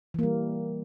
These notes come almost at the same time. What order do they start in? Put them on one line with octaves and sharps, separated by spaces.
E3 A#3 G3